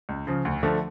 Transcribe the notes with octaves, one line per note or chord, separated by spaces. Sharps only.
C#2
C#3 F3
D2
D3 F3 A3